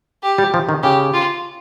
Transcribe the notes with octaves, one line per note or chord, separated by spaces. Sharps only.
G4
G3
F3
D#3
C#3 G4
F4